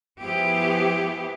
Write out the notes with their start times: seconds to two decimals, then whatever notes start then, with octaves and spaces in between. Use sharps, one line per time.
0.19 F3 B3 E4 G4 G#4